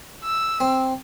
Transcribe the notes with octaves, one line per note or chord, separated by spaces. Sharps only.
E6
C4